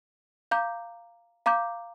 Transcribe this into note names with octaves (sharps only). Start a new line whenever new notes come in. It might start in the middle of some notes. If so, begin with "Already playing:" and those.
F5 A#5 D6 G6
F5 A#5 D6 G6